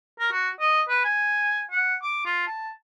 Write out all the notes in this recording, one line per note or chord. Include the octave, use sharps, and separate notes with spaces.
A#4
F#4
D#5
B4
G#5
F#5
D6
F4
A5